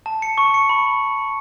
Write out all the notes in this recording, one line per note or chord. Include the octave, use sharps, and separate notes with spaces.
A5
C#7
C#6
C#7
B5